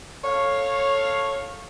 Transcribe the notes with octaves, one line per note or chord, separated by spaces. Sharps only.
A4 C#5 F5